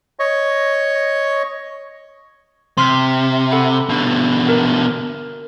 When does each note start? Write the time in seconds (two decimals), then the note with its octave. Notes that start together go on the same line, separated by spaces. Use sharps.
0.19 C#5 D#5 C#6
2.78 C3 C6 F6 B6
3.52 A4 F#5 B5
3.89 B2 D3
4.49 A#4